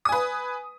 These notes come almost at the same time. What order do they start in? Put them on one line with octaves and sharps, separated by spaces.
D#6 G#5 B4